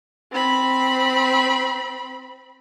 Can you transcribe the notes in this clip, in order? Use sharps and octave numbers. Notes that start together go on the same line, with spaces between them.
C4 B5